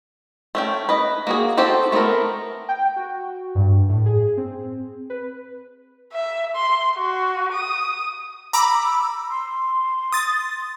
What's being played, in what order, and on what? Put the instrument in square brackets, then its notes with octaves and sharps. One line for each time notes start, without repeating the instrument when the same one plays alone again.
[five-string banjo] A3 C#4 G5
B4 D#5
A#3 F#4 G#4
C4 F#4 G4 A4
A3 B3 C4 A4 A#4
[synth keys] G5
F#4
G2
A2
G#4
C4
B4
[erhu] E5
C6
F#4
D#6
[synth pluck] A#5 B5 D6 [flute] E6
[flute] C6
[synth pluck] D#6 A6